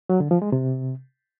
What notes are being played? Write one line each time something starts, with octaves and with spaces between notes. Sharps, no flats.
F#3
D3
F3
G#3
C3